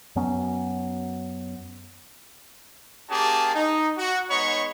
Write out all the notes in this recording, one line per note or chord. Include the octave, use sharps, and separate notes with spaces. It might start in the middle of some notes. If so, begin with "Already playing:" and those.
F#2 F#3 B3 C#4
A#3 C#4 G4 G#4 A5
D#4
F#4
G#3 B3 D#4 C#5 B5 C#6